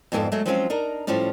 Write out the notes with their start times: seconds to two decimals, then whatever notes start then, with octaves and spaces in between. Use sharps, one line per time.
0.12 F2 G#2 B3 G#4 A4 D5
0.32 F#3 G#3 A3
0.46 F3 F#3 G#3 C4 C#4 F4
0.70 D4 D#4 A#4
1.07 A2 F3 G3 C#4 D5